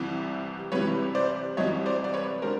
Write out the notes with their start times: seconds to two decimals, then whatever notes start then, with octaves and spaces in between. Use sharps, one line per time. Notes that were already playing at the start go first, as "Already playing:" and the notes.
Already playing: C2 C3 E3 G3
0.72 C2 C3 E3 G3 B4 C#5
1.15 C5 D5
1.57 C2 C3 E3 G3 C#5 D#5
1.86 C5 D5
2.04 D5
2.14 B4 C#5
2.42 D3 G3 A#4 C5